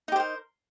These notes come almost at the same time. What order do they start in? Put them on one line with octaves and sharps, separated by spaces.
D#4 G4 C5 A#4